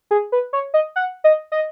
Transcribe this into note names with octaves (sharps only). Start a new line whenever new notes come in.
G#4
B4
C#5
D#5
F#5
D#5
D#5